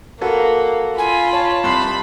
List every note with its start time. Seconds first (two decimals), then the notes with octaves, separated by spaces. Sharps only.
0.21 A#3 F#4 A4 B4
0.98 F4 G#5 B5
1.33 C#5 A5
1.64 C2 B5 C6 C7